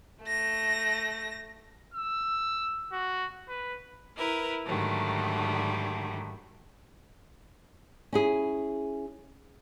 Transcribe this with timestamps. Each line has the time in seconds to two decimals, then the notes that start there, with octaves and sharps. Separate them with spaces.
0.24 A3 A#6
1.94 E6
2.92 F#4
3.48 B4
4.16 E4 A#4 B4
4.66 G#2 D3 D#3 F#3 G3 A3
8.13 C#4 E4 G#4